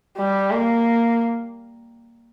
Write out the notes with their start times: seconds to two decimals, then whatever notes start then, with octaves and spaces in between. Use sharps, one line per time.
0.18 G3
0.51 A#3